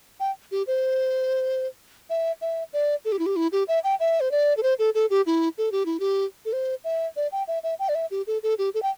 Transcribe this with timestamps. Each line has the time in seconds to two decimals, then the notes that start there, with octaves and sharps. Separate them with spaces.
0.20 G5
0.52 G4
0.67 C5
2.10 E5
2.41 E5
2.73 D5
3.05 A4
3.12 G4
3.19 E4
3.26 G4
3.36 E4
3.52 G4
3.68 E5
3.84 G5
4.00 E5
4.21 C5
4.31 D5
4.57 A4
4.63 C5
4.79 A4
4.95 A4
5.10 G4
5.27 E4
5.58 A4
5.72 G4
5.86 E4
6.00 G4
6.45 A4
6.53 C5
6.84 E5
7.16 D5
7.32 G5
7.48 E5
7.63 E5
7.79 G5
7.89 D5
7.95 E5
8.11 G4
8.27 A4
8.43 A4
8.58 G4
8.74 A4
8.83 G5